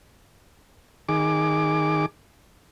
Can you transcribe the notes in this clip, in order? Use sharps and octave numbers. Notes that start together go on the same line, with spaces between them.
D#3 G#4 D6